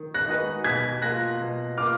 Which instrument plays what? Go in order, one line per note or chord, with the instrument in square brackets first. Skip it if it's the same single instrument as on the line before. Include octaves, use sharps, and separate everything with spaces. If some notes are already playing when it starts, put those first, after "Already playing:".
Already playing: [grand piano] D#3
[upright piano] F#6 A#6
[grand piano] G#3 D#4 F#4 B4
[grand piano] B2 [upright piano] G#6 B6
[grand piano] A#3 F4 [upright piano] F#6 A#6
[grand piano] B2
[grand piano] A#3 F4 [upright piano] D6 F6